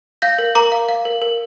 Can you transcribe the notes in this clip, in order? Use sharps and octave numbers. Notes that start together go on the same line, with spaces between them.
F5 G6 A#6
A#4
A#4 A#5 D6
F5
F5
A#4
A#4